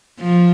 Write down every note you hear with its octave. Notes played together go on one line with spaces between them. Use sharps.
F3